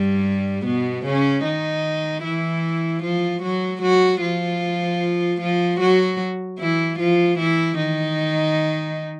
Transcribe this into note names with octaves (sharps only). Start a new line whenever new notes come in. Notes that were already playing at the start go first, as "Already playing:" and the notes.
Already playing: G2 G3
B2 B3
C#3 C#4
D#3 D#4
E3 E4
F3 F4
F#3 F#4
F#3 F#4
F3 F4
F3 F4
F#3 F#4
E3 E4
F3 F4
E3 E4
D#3 D#4